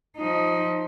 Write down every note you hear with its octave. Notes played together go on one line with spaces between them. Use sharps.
F3 D#4